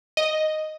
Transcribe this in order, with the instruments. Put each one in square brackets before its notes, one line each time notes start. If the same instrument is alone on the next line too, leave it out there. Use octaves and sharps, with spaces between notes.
[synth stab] D#5